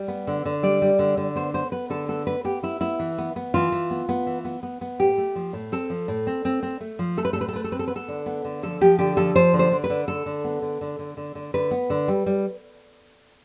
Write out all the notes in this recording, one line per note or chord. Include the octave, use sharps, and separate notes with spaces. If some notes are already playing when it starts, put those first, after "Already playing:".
Already playing: G3
B3
D3
D3
G3 D5
G3
D3
D3
B3 C5
B3 C5
B3 B4
D3 A4
B3 A4
B3 B4
B3 G4
B3 E4
B3 E4
E3
B3
B3
E3 F4
E3
B3
B3
E3
B3
B3
B3
A2 G4
A3
F3
A2
C4 A4
F3
A2
C4
C4
C4
A3
F3
A3 A4
B4
A4
A2 B4
A4
A3 B4
A4
C4 B4
A4
B3 B4
A4
D3
B3
D3
F3 A4
F3 G4
D3 G4
F3 A4
F3 C5
D3
C5
D3
B4
D3
D3 A4
D3
B3
D3
D3
D3
D3
D3
D3 B4
B3
D3
G3
G3